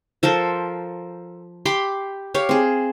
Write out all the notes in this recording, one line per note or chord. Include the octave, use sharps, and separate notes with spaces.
F3 A4 A#4 C5
G4 B5 C6 D6
G4 C#5 F5
C4 G#4